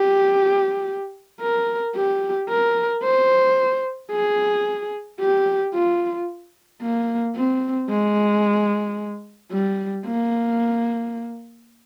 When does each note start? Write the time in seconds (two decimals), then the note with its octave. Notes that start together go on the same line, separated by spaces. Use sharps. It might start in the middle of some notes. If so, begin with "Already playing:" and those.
Already playing: G4
1.41 A#4
1.95 G4
2.49 A#4
3.03 C5
4.11 G#4
5.20 G4
5.74 F4
6.82 A#3
7.36 C4
7.90 G#3
9.52 G3
10.06 A#3